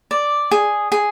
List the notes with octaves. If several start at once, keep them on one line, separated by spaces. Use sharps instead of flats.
D5
G#4
G#4